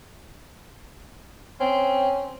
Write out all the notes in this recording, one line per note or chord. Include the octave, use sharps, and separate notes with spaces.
C4 C#4